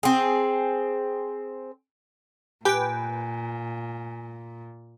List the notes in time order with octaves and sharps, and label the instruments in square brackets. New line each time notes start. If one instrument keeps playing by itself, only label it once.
[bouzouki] C4 G#4
[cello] A#2 [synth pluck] G4 [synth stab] B4 G5 [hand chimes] G#5